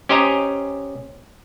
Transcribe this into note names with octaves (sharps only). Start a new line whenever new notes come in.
C#4 G4 C5 D#5 G#5 A#5